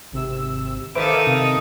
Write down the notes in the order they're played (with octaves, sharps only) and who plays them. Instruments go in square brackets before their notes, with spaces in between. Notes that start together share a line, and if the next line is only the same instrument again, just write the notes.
[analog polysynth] G#1 C3 E6
[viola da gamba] D#3 D#4 A4 [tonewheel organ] B4 C5 D6 [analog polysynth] E5 F5
[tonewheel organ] C3 D#6